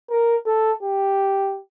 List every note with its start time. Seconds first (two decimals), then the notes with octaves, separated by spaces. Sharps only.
0.10 A#4
0.46 A4
0.83 G4